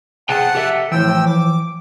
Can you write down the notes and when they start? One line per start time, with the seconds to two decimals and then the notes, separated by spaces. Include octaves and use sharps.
0.29 C3 G#4 F#5 G5 A5
0.55 G4 A4 E5
0.92 A2 E3 F3 G5 E6
1.26 D6